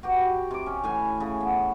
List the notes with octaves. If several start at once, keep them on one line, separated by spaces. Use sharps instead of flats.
F#4 G4 B4
C3 D6
C#4
A2 E3 G#5
C#3
B3